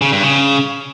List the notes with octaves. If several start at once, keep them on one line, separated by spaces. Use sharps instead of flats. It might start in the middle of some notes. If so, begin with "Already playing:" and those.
C#3
G2
C#3